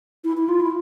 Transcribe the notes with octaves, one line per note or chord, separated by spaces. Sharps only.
E4
E4
F4
E4